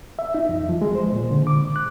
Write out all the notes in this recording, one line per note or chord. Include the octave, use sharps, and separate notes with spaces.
E5
D#4
F2
F3
G#3
C5
A#2
D3
D6
F#6